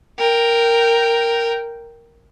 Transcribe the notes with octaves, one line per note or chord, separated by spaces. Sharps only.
A#4 G5